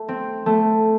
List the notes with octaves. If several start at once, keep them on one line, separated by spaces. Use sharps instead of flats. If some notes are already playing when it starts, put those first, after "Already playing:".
Already playing: A3
C4
A3